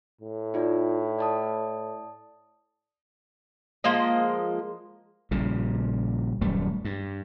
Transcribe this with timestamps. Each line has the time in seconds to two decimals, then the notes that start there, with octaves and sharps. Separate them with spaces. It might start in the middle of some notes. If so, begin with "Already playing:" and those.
0.21 A2
0.54 D#4 F4 D5
1.19 D5 A5 D#6
3.84 F3 G#3 A#3 D#5
5.31 A#1 A#2 C#3 G3
6.41 D#1 F#2 G3 A3
6.85 G2